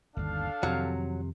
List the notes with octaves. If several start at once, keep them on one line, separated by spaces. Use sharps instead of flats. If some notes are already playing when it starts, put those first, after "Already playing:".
G1 D#2 D4 A4 F5
F2 C3 D#3 F#3